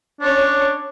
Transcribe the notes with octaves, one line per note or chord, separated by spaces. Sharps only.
C#4 D4 C#5